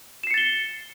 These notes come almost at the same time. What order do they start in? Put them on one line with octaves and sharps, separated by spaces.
E7 C7 C#7 A6 G7